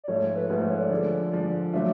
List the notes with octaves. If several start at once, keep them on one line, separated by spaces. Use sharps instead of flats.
D5
G#2 F3 A3 C#5
C#5
B4
G#2 F3 A3 B4
C5
C#5
D5
D3 F3 G#3
D3 F3 G#3
D3 F#3 A3 D4 F4 E5